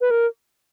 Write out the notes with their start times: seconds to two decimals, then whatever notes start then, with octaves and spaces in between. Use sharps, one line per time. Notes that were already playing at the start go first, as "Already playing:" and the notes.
0.01 B4
0.11 A#4